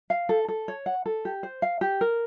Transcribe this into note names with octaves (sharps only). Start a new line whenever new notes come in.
F5
A4
A4
C#5
F#5
A4
G4
C5
F5
G4
A#4